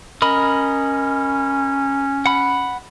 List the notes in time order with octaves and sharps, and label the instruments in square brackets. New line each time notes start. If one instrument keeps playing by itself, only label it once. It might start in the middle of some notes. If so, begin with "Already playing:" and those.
[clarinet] C#4 [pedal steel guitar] A#4 D#5 B5
[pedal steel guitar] F#5 B5